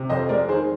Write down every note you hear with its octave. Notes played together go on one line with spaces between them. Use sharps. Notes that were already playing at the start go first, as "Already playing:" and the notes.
Already playing: C3
F2 C5 D#5
G#3 A#4 D5
D#3 G#4 C5